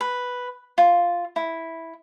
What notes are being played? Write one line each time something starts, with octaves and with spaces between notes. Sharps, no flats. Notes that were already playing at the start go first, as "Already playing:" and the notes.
B4
F4
E4